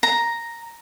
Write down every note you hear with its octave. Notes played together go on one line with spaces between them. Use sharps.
A#5